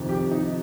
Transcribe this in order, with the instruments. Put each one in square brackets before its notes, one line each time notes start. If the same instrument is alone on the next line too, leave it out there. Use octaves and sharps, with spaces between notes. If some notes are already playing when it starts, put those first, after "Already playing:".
Already playing: [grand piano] F2 C3 D#3
G4
D#4